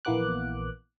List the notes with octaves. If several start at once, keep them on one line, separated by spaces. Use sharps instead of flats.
A#1 E3 A#3 B3 D6 F#6